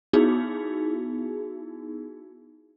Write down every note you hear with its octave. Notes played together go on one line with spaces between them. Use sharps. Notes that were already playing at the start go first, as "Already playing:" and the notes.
B3 D#4 E4 F#4 G#4